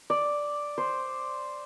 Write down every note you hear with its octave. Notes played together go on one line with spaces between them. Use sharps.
D5
C5